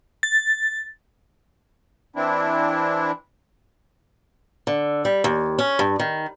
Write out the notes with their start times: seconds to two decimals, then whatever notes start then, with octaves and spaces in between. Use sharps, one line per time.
0.23 A6
2.16 E3 C4 D4 E4
4.67 D3
5.05 G3
5.24 D#2
5.59 C#4
5.79 G2
5.99 D#3